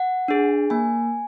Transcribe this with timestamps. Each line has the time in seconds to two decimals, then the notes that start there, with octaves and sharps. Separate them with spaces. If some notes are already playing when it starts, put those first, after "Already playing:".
Already playing: F#5
0.28 D4 G#4
0.70 A#3 G#5